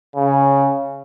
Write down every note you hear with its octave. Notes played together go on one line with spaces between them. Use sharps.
C#3